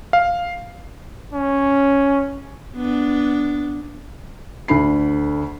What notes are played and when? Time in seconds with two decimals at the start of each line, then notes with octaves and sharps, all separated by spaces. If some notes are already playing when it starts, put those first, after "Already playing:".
0.13 F5
1.33 C#4
2.76 B3 D4
4.68 D2 D3 B5 C7